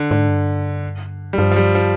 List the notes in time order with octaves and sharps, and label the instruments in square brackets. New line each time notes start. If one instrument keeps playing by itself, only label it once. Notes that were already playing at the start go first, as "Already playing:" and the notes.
Already playing: [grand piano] D3
[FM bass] G#2 [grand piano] D3
[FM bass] G2
[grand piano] G3
[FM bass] G2 [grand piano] F3
[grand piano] F3
G3
F3